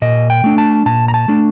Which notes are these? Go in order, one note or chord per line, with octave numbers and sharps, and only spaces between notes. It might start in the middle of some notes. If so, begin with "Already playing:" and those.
A#2 D#5
G5
A3 D4
A5
A#2 A5
A#5
A5
A3 D4